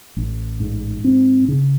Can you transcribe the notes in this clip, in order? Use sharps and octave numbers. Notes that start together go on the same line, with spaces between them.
A1
G#2
C4
C#3